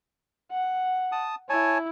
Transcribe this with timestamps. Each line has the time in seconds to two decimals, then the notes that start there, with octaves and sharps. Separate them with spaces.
0.51 F#5
1.12 A5 D#6
1.49 E4 C#5 G#5 A5